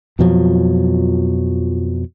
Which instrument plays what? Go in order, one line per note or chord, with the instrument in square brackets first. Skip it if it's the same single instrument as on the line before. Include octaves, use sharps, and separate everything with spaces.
[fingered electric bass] F2 B2 F3 F#3